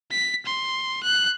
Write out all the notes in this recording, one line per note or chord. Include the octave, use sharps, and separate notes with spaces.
B6
C6
F#6